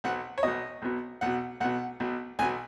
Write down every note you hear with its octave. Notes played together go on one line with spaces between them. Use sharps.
B1 B2 F#5
C#5
B1 B2 D#5
B1 B2
B1 B2 F#5
B1 B2 F#5
B1 B2
B1 B2 G#5